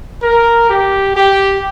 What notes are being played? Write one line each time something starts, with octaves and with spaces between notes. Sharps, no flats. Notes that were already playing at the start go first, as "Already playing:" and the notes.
A#4
G4
G4